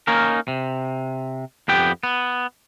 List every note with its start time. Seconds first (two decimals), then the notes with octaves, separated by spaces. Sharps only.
0.07 A#3 C#4 D#4 A#4
0.48 C3
1.68 F2 B3 G4 G5
2.03 B3